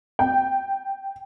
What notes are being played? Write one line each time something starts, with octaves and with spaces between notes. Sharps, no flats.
G5